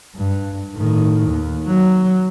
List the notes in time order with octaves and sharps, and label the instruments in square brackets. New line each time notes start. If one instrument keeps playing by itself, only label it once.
[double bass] G2
A2 D#3
D#2
F#3